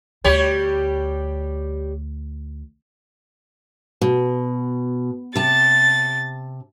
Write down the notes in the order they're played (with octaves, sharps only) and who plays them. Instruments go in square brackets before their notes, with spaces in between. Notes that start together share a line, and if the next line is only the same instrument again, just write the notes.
[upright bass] D2 [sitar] G3 G4 C#5
[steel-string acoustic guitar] B2
[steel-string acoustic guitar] C3 A5 [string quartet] A6